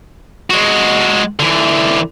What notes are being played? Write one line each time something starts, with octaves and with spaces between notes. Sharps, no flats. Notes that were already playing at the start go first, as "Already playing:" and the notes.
G#3 F#4
D3 E3